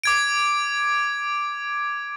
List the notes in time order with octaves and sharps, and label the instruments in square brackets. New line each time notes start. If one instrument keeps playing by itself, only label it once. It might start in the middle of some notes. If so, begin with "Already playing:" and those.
[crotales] D6 G#6 D7